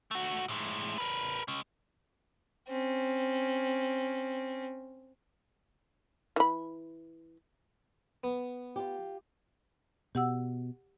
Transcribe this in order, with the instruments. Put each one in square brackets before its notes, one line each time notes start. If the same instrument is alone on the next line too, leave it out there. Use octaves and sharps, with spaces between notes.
[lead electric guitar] A3 F#4
A2 G#3
A#4 B4
G#3 C#4
[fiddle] C4 C#4
[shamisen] E3 B5
[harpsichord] B3
[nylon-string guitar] F4 G4
[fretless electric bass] B2 [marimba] G4 F#5 E6